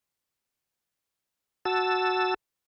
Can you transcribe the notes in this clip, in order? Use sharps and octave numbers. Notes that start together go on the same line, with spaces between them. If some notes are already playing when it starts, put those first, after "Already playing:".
F#4 A5 E6